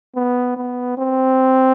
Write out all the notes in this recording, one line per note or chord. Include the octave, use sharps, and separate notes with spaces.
B3
B3
C4